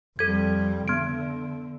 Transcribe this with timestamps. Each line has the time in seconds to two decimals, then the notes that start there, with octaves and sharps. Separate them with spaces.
0.19 F2 G3 A4 G#6
0.88 D3 B3 D7